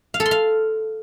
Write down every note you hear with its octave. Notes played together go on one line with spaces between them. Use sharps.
F5
A4
C6
F5